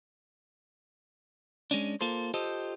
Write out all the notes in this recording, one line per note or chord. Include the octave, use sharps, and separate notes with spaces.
G#3 C#4 D4
A#3 F4 A4 C5
F4 G4 A4 C5 D#5